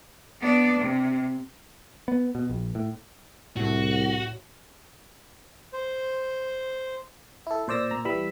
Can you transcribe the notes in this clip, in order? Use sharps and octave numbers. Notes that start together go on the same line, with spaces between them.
B3 D4
C3
B3
B2
A#1
A2
C2 A2 F#4
C5
E4 A4
A#2 C5 D5 E6 A#6
A#2 A#5
E3 G3 B5 E6